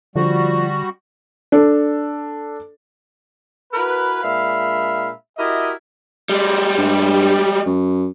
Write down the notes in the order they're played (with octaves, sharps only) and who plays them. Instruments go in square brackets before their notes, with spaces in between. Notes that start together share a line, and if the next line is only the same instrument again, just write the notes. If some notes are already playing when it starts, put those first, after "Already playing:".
[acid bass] D3 [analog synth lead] F3 [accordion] G3 F#4
[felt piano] D4 A4
[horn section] E4 F#4 A#4 B4
A#2 G#3 D4 E5 F5 B5
E4 F#4 G4 A#4 D#5 E5
[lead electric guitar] G3 G#3
[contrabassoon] G2
F#2